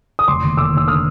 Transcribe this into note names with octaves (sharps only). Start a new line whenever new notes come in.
D#6
F1 C6 D6
D#2
F1 D6 E6
D#2 E6
D3 D#6 F6